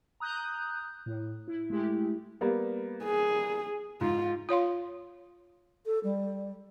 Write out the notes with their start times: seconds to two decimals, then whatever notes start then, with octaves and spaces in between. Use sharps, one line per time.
0.20 A#5 D#6 F#6 G6
1.06 A2
1.48 E4
1.70 G#3 A3 E4 G4
2.41 G3 A#3 B3
3.04 G#4
4.01 G#2 F4
4.49 F4 C#5 F5 C6
5.86 A4
6.04 G3